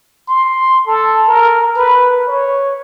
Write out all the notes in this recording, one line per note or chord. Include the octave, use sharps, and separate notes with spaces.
C6
A4
A#4
B4
C#5